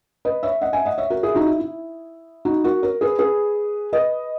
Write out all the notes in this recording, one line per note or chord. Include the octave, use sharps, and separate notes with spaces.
B4 D#5
C#5 E5
D#5 F#5
E5 G#5
D#5 F#5
C#5 E5
F#4 A#4
E4 G#4
D#4 F#4
E4
E4
D#4 F#4
F#4 A#4
A#4 C#5
G#4 B4
G#4 B4
B4 D#5